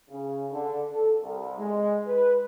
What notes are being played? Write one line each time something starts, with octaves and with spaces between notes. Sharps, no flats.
C#3
D3
A4
C2
G#3
B4